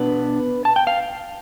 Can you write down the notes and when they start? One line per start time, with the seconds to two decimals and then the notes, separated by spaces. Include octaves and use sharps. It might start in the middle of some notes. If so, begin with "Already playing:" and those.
Already playing: B2 B3 D4 B4
0.65 A5
0.76 G5
0.87 F5